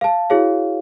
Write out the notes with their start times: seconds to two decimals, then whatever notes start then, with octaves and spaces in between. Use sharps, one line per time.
0.01 F5 A5
0.30 E4 F#4 G#4 C#5 F5